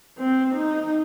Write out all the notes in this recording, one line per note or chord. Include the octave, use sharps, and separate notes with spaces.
C4
D#4